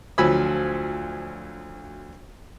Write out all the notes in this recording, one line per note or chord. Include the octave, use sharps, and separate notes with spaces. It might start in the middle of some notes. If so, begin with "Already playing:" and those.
D2 F3 F#3 G#5 B5 E6